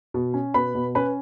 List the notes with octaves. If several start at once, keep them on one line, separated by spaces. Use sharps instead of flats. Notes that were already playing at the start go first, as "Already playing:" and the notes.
B2
C#4
B2 B4 B5
B2
C#4 B4 B5